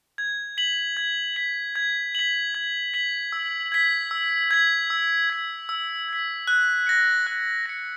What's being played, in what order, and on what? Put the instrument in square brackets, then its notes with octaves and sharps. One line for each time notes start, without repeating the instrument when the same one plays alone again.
[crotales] G#6
B6 F#7
G#6
B6 F#7
G#6
B6 F#7
G#6
B6 F#7
E6
G#6 B6
E6
G#6 B6
E6
G#6 B6
E6
G#6 B6
F#6
A#6 C#7
F#6
A#6 C#7